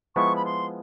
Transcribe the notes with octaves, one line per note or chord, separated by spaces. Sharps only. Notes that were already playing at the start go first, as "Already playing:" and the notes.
F3 G#3 B3 E4 C#6
B5
C6